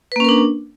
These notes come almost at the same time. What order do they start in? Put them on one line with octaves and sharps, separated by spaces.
B4 A#3 C#4 A#4 D4